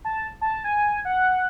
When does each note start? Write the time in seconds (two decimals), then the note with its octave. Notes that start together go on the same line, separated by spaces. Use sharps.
0.05 A5
0.41 A5
0.64 G#5
1.05 F#5